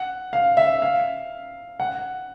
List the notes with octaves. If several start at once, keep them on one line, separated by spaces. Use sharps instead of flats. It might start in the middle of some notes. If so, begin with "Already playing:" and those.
Already playing: F#5
F5
E5
F5
F#5